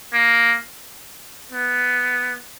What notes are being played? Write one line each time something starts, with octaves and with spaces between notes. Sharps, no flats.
A#3
B3